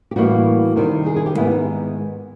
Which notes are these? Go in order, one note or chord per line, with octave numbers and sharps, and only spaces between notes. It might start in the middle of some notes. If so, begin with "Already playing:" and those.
G4
A2 E3 G3 A#3 F#4
F#4
C3 D#3 G3 C4
G#4
G#4
G4
G#2 D#3 G#3 B3 E4
D#4